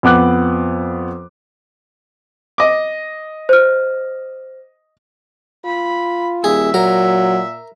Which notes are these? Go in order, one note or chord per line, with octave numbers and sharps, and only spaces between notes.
F2 B3 D6 F#6
D#5 D6
C5 F6
F4 B5
D#1 G#4 E5
A#2 F#3 A#4